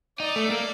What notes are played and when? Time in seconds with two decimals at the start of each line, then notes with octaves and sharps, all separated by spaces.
0.20 D#4 D5
0.36 A3
0.51 A#3